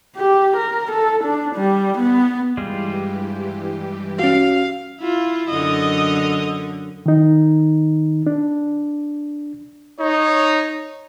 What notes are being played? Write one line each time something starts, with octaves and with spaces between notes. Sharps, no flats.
G4
A#4
A4
D4
G3
B3
G2 E3 G3 G#3 F4 G4
C#4 F#4 F5
E4 F4
F#2 D3 D#5
D#3 D#4
D4
D#4 C#5